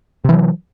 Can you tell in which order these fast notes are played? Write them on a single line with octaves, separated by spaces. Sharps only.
C3 E3 F#3